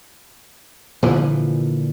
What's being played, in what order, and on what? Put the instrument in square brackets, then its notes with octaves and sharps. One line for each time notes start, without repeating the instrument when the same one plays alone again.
[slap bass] A#2 D3 E3 F3